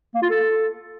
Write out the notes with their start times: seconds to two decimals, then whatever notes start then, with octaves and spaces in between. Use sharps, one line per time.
0.14 A#3
0.22 F4
0.30 A4